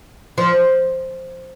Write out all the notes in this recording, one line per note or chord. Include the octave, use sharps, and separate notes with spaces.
F3